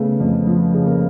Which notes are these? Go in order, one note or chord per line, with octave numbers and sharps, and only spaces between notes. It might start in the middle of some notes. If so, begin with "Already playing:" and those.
Already playing: C#3 A3 B3
F2
F3
C#3
A#3